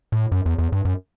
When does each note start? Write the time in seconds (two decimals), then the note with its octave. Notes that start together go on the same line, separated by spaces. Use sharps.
0.12 A2
0.32 F#2
0.46 E2
0.59 E2
0.72 G2
0.85 F#2